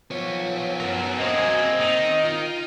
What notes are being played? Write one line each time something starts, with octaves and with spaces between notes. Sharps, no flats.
F3 B3 C#5
F#4 A#4
A#3 C4 G#4 C5 D#5
D#3 D#4
F4